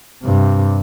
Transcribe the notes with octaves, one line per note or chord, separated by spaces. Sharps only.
G2 C3